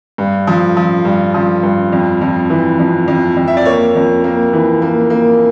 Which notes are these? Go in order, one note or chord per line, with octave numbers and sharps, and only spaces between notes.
G2
F3
F3
G2
F3
G2
F2
F2
E3
F2
F2
F2
E5
D5
A#3 C#5
F2
A#3
E3
A#3
A#3